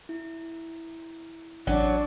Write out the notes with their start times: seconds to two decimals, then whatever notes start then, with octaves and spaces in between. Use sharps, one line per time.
0.09 E4
1.67 A1 F#3 D4